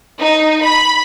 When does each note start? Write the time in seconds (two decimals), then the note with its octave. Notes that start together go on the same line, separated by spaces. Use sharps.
0.19 D#4
0.62 B5